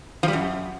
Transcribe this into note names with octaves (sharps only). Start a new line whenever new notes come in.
F3
G3
F#2